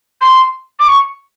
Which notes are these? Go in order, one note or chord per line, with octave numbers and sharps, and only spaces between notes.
C6
D6
C#6